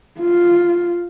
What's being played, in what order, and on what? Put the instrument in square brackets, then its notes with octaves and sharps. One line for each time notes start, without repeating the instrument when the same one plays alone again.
[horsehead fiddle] F4